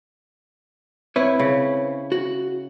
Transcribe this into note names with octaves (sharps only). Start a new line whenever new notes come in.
C4 E4 B4 C#5
C#3
F#4